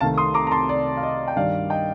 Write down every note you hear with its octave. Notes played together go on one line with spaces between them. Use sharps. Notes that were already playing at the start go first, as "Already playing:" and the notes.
C2 C3 D#3 A3 F5 A5
C6 D#6
A#5 D6
A#5
A5 C6
D5
F5
D#5
G5
G2 D#3 G3 D5 F5
D#5 G5